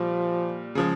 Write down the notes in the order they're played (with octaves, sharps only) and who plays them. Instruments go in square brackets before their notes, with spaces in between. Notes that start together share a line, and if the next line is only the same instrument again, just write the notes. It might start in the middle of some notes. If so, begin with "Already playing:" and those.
Already playing: [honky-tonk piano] A#2 G3 [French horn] F3
[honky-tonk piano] C#3 F3 G#3